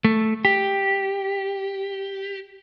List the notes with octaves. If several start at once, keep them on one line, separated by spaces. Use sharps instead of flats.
A3
G4